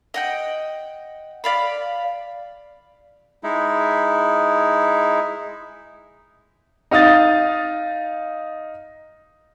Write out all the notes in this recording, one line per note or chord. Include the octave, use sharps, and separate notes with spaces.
D#5 F#5 G5
D5 F5 B5
G#3 D#4 E4
D#4 F5 D#6 A6